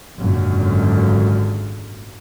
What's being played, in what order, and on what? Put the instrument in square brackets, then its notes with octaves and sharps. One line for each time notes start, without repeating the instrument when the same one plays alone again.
[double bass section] G#1 F#2 A#2 D3